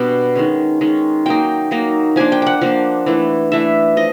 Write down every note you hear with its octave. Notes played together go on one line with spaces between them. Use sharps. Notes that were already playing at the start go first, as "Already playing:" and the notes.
Already playing: B2 G3 B3 D4
D#3 G#3 C#4
D#3 G#3 C#4
F#3 A#3 D#4 G5
F#3 A#3 D#4
F3 A#3 D4 G#5
G5
F#5 G5
F3 A#3 D4
E3 A3 D4
E3 A3 D4 E5
F3 D#5